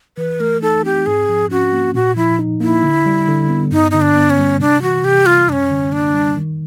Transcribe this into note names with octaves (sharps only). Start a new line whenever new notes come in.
E3 B4
A3 A#4
D#4 A4
C4 G4
G#2 G#4
F3
C#4 F#4
A#3
A#2 F#4
F3 E4
D#4
A#3 E4
D3
G3
D3
B3
G2 D#4
D3 D#4
D4
B3
C#4
G3
C3 D4
E3 F#4
C3 G4
G3 F4
F#2 C#4 D4
D3
A#3 D4
G3
D#3